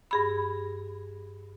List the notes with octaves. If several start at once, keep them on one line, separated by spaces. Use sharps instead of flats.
G2 G#4 B5